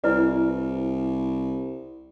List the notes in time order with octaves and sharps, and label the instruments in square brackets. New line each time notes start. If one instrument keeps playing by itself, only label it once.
[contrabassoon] C2 [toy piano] E4 B4 D5